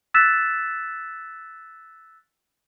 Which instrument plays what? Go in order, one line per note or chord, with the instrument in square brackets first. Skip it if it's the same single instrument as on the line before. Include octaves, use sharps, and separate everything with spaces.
[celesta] E6 F#6 A6 B6 E7